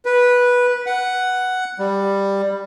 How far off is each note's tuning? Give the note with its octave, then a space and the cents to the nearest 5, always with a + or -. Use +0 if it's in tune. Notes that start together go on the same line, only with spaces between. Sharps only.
B4 -10
F#5 +5
G3 +10